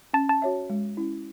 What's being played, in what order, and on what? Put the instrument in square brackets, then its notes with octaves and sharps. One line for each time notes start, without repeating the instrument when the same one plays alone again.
[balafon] C#4 [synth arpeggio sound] A5
[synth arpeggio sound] A5
[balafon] F#4 C#5 E5
G#3
C#4 E4